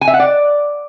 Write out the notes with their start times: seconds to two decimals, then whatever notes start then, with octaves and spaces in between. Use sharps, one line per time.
0.01 G#5
0.07 E5
0.14 F#5
0.20 D5